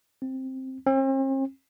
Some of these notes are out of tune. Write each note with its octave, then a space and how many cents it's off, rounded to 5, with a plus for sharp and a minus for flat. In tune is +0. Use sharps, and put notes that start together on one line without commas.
C4 +5
C4 +45